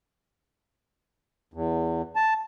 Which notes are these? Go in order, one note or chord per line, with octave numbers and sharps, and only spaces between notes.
E2
A5